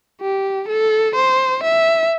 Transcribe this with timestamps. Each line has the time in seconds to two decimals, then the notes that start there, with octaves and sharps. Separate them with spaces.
0.21 G4
0.69 A4
1.16 C5
1.64 E5